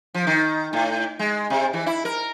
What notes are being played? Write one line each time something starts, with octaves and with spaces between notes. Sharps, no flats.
F3
D#3
A2
G#3
C3
E3
E4
A#4